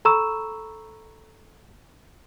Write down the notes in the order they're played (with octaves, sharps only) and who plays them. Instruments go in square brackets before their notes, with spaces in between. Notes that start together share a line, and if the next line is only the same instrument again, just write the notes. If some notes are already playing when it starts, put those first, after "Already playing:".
[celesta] A4 A#5 B5 C#6 E6 E7